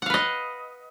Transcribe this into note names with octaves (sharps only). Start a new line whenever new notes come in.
B4 D#5 F5 F#5